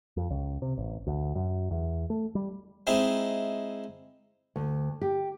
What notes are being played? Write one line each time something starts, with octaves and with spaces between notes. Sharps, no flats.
F2
C#2
C3
A1
D2
F#2
E2
A3
G3
G#3 C4 D#4 E4
D2
G4